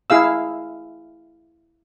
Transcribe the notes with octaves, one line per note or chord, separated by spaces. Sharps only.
E4 G#4 F5 E6